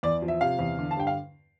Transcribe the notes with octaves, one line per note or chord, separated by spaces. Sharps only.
E2 D5
F3
E5
C3 F5
E2
D3
A5
G2 G5
F5